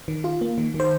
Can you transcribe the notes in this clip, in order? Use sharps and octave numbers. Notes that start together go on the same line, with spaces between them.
D#3
F4
A#3
D#3
D#3
C5